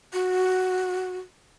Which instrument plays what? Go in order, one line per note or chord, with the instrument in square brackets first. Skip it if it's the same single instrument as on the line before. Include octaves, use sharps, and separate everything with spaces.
[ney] F#4